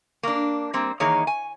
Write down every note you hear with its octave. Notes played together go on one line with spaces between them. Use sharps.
A#3 D4
G3 A#3 C4
D#3 E3 A#3 D#4 G#4 C#5
G#5